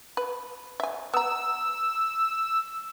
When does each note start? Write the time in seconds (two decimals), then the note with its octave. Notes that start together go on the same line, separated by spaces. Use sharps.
0.17 B4
0.80 E5 G#5
1.14 B3 A#5 E6